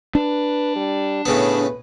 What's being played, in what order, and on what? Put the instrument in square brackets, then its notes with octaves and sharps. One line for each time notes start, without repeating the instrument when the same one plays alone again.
[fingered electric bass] D4 [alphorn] B4
[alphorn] G3
[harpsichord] A2 C#3 B3 [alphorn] B4